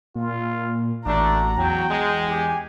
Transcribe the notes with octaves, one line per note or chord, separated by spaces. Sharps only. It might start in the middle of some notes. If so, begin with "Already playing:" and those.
A#2 F4
A1 A3 D4 F#4 A#5
E2 F#3 G5
G#3
E2 G4 G#5